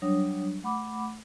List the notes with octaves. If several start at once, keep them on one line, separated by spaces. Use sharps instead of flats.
F#3 G3 D4 C#5 D#6
A3 F#5 B5 D6